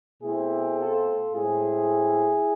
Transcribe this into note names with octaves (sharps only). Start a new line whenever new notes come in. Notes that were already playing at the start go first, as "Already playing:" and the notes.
B2 A3 C4 E4 G#4
F4 A4
A2 G#3 C4 E4 G#4